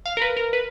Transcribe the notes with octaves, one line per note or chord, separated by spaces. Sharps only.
F5
A#4
B4
A#4
B4